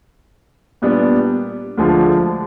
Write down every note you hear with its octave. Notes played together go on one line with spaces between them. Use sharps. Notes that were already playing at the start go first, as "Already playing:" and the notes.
A#2 G3 B3 D4
D2 D3 F3 G#3